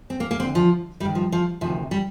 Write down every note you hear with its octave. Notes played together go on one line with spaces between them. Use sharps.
C4
A#3
A#3
D2 D3 C4
F3
G2 D#3 G3
F3
F3
D2 C3 D#3 F3
G3